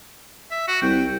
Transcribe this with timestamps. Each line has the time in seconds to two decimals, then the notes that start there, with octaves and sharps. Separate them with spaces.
0.51 E5
0.68 F#4
0.82 C2 G5